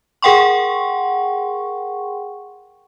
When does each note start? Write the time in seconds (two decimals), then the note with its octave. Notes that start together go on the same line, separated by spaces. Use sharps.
0.22 G#4 A#4 F#5 G5 C6 C#6